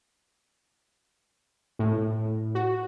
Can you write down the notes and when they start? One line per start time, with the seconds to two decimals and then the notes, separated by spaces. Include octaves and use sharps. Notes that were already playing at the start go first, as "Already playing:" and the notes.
1.79 A2
2.55 F#4